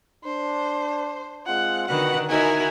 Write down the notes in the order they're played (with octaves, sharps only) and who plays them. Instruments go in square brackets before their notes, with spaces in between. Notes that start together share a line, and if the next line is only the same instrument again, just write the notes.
[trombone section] D4 [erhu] C5
[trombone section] G#3 C4 F4 [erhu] F#5
[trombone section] B2 F#4 B4 [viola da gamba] D3 D#3 [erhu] F#5
[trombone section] D#4 [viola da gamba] E4 F#4 A#4 [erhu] G#5